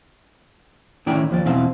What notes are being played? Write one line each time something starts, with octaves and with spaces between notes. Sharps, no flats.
A2 D#3 C#4 E4 D5 G5
D#2 F3 D5
E2 B2 C4 E4 F5